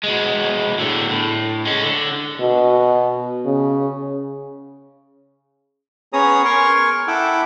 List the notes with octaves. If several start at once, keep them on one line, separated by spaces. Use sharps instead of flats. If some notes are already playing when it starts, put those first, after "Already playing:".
B2 G#3
A2 D3
A2
G#3 C#4
D3
B2
C#3
B3 C#4 G#4 C#5 A#5 D#6
A#4 G#5 C6 C#6
E4 A4 F#5 G5 D6